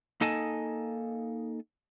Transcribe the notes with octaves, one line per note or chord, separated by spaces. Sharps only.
A#3 D#4 A4 D#5 G#5 A5